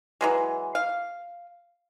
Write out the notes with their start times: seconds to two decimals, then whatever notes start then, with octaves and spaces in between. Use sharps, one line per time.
0.21 E3 F#3 G#3
0.75 F5